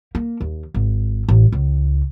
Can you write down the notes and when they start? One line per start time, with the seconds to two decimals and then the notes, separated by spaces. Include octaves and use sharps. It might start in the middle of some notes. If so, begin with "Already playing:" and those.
0.15 A#3
0.41 D#2
0.74 G#1
1.28 A1
1.52 C#2